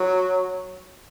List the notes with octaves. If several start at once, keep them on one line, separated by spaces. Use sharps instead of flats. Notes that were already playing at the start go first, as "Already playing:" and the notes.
Already playing: F#3